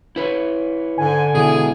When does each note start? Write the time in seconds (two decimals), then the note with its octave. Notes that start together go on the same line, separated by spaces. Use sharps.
0.16 E4 B4 C#5
0.98 G#2 D3 G#5
1.34 B2 E3 E4 G#4